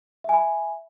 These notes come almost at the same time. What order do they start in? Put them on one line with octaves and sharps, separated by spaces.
E5 G#5 B5